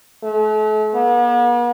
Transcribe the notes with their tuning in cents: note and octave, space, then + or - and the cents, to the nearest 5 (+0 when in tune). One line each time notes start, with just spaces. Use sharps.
A3 -40
B3 -45